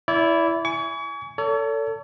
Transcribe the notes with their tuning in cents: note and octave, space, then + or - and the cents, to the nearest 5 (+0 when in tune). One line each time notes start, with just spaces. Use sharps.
E4 +5 D5 -30
G#5 +0 C#6 +40
A4 +25 C#5 +40